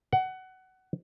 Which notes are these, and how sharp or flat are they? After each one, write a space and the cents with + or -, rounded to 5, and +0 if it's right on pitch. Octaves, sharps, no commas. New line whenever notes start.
F#5 +20